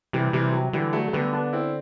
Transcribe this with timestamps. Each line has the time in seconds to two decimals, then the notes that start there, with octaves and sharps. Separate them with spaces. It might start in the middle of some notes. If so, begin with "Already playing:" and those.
0.13 C3 E3 G3
0.33 C3 E3 G3
0.53 F#3
0.73 D3 E3 G3
0.93 F#3 A3
1.08 A3
1.13 D3 G3 B3
1.33 B3 D4
1.53 C4 E4